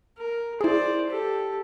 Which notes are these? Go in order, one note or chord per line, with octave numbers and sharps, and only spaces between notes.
A#4
E4 G#4 C5 D5
G4 A4